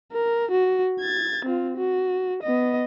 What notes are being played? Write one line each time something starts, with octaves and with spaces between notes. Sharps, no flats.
A#4
F#4
G#6 A6
C4 F4
F#4
B3 D#5